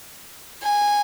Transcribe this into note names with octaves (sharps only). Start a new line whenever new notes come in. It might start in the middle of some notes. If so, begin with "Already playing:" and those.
G#5